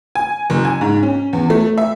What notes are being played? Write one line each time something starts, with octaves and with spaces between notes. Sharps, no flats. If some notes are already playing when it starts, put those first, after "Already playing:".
G#5
F#1
G#5
G#2
C#4
E2
A3
E5